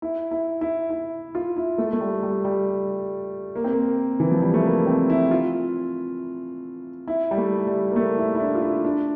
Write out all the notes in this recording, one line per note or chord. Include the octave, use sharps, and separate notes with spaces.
E4
E4
E4
E4
F4
E4
A3
A3
G3
G3
G3
A#3
C4
A#3
E3
F3
G3
A3
A#3
C4
E4
F4
E4
G3
A3
G3
A#3
A3
E4
E4
D4
F4
E4
D4